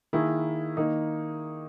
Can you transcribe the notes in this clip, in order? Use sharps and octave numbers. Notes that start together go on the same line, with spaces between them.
D#3 A#3 E4 G#4
D#3 A#3 D#4